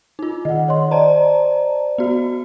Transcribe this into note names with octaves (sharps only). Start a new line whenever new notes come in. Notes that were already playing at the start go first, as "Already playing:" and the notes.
D#4 F4
D#3 D#5 F#5
C#5 D#5 C6
C5 D5 D#5 A5 A#5
B3 F#4